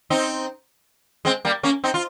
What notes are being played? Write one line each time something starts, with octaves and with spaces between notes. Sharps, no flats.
C4 D#4
G#3 C4
G3 A#3
A#3 C#4
C4 D#4
F4